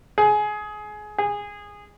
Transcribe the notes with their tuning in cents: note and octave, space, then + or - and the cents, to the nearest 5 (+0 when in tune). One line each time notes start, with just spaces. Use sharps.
G#4 +20
G#4 -15